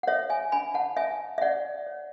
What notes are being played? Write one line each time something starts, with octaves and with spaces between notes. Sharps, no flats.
F#5
A4 C#5 E5
E5 G#5
D4 G#5 B5
F#5 A5
C#5 E5 G#5
E5
C#5 D5 F#5
C#5